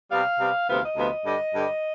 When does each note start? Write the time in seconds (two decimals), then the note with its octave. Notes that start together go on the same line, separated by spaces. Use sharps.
0.11 C3 G3 B3 F5
0.39 C3 G3 B3
0.68 D2 C3 F3 B3 F5
0.83 D#5
0.97 D2 C3 F3 B3
1.26 G2 D3 G3 D#5
1.55 G2 D3 G3